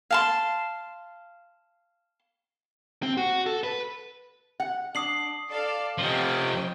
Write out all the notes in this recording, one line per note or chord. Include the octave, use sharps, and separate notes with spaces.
F5 A5 C6
C4
F#4
A4
B4
F#5
D4 D#6 C7 F#7
A4 D5 F5
C3 F3 C#4 D#5 G5